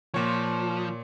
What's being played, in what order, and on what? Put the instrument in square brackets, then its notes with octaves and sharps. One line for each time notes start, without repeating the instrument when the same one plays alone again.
[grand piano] A#2 C#5 [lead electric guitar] F3